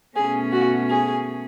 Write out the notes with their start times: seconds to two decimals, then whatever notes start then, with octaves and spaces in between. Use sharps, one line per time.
0.16 B2 A3 C#4 G#4
0.52 F#4
0.89 G#4